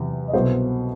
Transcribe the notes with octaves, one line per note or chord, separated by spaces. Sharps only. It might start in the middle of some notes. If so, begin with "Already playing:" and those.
Already playing: E2 C3 F#3
D#5
C2 B2 F#3 B3 A4 C5